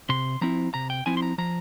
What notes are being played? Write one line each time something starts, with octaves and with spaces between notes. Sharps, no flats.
C3 C6
F3 C4 E4 A#5
C3 A#5
G5
F3 C4 E4 G#5
C6
A#5
F3 A#5